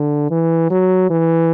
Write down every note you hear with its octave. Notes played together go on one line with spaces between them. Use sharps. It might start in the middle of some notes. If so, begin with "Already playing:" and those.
Already playing: D3
E3
F#3
E3